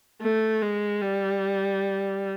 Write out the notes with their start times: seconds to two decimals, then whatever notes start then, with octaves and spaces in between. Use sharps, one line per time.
0.21 A3
0.62 G#3
1.01 G3